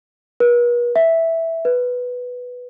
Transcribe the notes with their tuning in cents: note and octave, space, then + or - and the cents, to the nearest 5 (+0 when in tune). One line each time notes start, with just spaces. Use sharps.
B4 -45
E5 -5
B4 +0